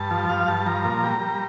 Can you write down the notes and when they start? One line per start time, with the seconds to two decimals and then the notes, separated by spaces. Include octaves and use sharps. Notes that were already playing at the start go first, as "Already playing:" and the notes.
Already playing: G2 A5
0.11 F3
0.29 G2 F5
0.48 G2 A5
0.66 F3 A#5
0.85 A#2
1.03 G3
1.21 G3